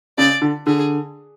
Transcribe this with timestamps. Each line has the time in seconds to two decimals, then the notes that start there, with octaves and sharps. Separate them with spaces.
0.18 C#3 D5
0.42 D3
0.66 D3 G#4